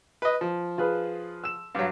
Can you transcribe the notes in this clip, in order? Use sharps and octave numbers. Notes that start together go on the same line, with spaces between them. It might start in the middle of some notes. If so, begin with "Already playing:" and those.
B4 D#5
F3
F4 G#4 B4
E6 E7
G2 F#3 F5